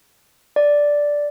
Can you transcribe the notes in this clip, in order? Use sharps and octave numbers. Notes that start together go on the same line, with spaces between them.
D5